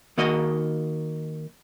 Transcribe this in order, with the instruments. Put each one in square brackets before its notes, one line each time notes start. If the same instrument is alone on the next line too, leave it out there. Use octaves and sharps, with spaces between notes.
[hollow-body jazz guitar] D#3 A#3 F#4 D#5